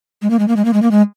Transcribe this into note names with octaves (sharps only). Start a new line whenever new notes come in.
G#3
A#3
G#3
A#3
G#3
A#3
G#3
A#3
G#3